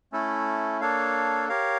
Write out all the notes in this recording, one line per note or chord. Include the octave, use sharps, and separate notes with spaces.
A3 C#4 E4 A4
A#3 D4 A4 C#5 F5
G4 A#4 C#5 F5